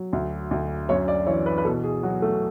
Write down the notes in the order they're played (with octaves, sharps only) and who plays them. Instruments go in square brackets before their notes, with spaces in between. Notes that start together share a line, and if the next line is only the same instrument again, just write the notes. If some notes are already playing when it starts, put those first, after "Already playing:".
Already playing: [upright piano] F#3
D2
D2
F#2 C#5
D5
E3 C#5
B4
B4
B2 A4
G#4
F#3 F#4
A3